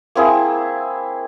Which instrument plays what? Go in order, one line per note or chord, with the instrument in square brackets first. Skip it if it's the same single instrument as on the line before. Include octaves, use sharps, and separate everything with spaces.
[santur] A#3 C4 E4 G#4